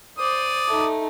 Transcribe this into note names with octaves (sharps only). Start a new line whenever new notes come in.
C5 D5 D#6
A3 D#4